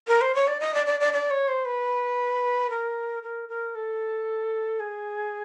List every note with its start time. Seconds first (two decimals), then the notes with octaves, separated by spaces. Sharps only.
0.08 A#4
0.21 C5
0.35 C#5
0.48 D5
0.60 D#5
0.74 D5
0.86 D5
1.00 D5
1.13 D5
1.30 C#5
1.48 C5
1.65 B4
2.70 A#4
3.23 A#4
3.49 A#4
3.75 A4
4.80 G#4